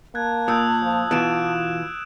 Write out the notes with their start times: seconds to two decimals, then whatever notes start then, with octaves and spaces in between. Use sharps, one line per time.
0.15 A#3 A5 F#6 G#6
0.48 A#2 D#6 E6 G6
0.83 F3
1.11 B2 E3 F4 F#6 D7 E7